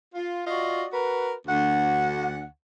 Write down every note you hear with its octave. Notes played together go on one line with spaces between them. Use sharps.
F4
F4 F#4 D5 D#5
F#4 A#4 B4
D2 F#5